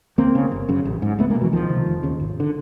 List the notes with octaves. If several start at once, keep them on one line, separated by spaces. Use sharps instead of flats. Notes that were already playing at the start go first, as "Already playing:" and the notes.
C#2 A#3 C4
C#3
G1
F#2 C#3
A1
G#2
C#2 A3 B3
G#3 A#3
B2
E3 F#3
C#2 D#3 F3
C3
F1
D#2 C#3
G#1
D3